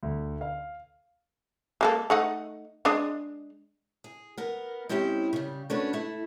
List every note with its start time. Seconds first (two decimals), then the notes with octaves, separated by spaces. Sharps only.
0.03 D2
0.41 F5
1.81 G#3 A#3 A4
2.10 A3 D#4 F#5
2.85 G#3 D4 D#5
4.04 G#4
4.38 B3 A#4
4.89 G#3 C4 C#4 E4 G4
5.33 C#3 G3
5.70 A3 C#4 D4 F#4 B4
5.93 A3 E4